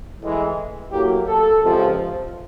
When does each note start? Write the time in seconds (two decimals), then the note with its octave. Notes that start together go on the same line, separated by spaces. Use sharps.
0.20 A2 E3 G#3
0.91 A2 F#3 A#3 G4
1.28 A4
1.62 C#2 C3 F3